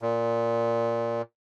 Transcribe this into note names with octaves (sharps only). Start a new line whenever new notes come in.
A#2